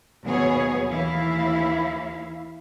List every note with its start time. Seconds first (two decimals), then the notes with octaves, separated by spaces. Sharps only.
0.25 D#2 B2 F#3 G#4 C#5
0.88 D#2 E3 E4 F5